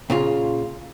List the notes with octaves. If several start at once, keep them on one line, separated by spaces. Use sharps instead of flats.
A#2 C#3 F4